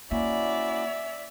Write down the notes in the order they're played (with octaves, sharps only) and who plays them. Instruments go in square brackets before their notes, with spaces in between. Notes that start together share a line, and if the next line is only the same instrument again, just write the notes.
[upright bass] A#3 [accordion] C#4 E4 F#4 [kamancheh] D5 [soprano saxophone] E5